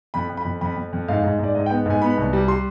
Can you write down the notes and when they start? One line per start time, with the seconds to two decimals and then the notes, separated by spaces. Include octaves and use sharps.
0.14 F2 B5
0.29 F2
0.37 B5
0.45 F2
0.61 F2 B5
0.76 F2
0.93 F2
1.08 G#2 F5
1.23 G#2
1.39 G#2 D5
1.55 G#2 D#5
1.66 G5
1.70 B3
1.86 G#2 G#5
2.02 B3 B5
2.17 C2
2.33 G3
2.48 G3 C6